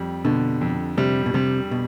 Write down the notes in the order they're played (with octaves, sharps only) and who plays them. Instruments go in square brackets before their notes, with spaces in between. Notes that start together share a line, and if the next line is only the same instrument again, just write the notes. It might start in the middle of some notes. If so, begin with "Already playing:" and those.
Already playing: [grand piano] F2 G3
[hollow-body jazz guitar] B2 [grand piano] D3
[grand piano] F2
[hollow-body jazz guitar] C3 [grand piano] G3
[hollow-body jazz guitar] B2
[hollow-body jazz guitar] C3 [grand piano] G3
[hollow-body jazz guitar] B2